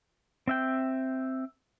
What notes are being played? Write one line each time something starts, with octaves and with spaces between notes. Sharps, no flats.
C4 E5 G5